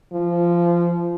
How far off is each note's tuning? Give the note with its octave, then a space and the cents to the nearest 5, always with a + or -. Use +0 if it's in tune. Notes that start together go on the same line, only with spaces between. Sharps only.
F3 -20